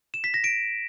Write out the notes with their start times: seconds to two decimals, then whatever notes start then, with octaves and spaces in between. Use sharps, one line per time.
0.14 E7
0.24 B6
0.34 A#6
0.44 D7